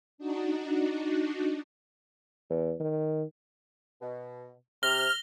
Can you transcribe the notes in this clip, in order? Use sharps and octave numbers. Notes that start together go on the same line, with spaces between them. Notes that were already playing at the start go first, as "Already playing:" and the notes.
D4 D#4 F#4
E2
D#3
B2
C3 F6 A#6 G7